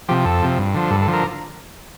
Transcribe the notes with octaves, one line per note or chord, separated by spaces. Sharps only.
C3 F3 G4
F2 A4
C3 F3
G2
D3 F3
G2 A4
A4
D3 F3
A#4